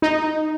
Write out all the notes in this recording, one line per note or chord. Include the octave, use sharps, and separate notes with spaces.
D#4